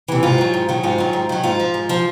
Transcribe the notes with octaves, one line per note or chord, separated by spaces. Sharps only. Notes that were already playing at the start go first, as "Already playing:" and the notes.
C3 E3
G#2 F4
D#3 F#3
G#2
D#3 F#3
G#2 F4
D#3 F#3
G#2
D#3 F#3
G#2 F4
F3
G#2
F3